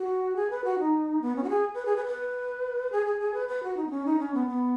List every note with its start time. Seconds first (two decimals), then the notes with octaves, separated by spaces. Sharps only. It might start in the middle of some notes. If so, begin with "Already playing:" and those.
Already playing: F#4
0.36 G#4
0.50 B4
0.64 F#4
0.79 D#4
1.22 B3
1.36 C#4
1.44 F#4
1.49 G#4
1.74 B4
1.85 G#4
1.96 B4
2.06 B4
2.92 G#4
3.06 G#4
3.20 G#4
3.34 B4
3.48 B4
3.63 F#4
3.77 D#4
3.87 B3
3.90 C#4
4.05 D#4
4.19 C#4
4.34 B3
4.47 B3